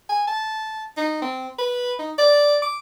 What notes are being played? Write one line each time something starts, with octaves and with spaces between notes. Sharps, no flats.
G#5
A5
D#4
C4
B4
D#4
D5
D6